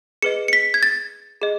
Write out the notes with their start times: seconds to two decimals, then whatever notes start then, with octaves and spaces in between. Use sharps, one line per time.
0.22 G#4 B4 D#5 C#7
0.48 C#7
0.53 B6
0.74 G#6
0.83 A6
1.42 G#4 D#5